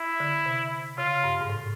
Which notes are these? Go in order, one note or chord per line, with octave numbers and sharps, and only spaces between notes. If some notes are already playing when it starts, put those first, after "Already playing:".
Already playing: E4
D3
C3
C#3 F4
G2
G#2
A2